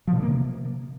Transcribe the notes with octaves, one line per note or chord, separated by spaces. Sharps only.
F3
B2
D3
A#3
C3